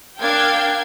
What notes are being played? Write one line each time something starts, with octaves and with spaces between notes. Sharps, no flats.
D4 A#4 F5 G5 G#6